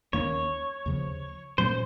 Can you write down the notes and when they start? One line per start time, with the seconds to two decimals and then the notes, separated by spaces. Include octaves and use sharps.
0.13 D#2 D#3 A#3 C#4 C#5
0.86 D#2 C#3 F3
1.58 A#2 F#3 A#3 C#4 C5